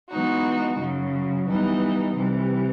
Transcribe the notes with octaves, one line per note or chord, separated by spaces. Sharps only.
E3 G#3 B3 D#4 F#4
F#2 C#3 F#3
E3 G3 B3 D#4
C3 E3 G3